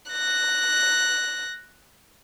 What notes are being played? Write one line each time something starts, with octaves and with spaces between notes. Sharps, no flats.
F#6 A#6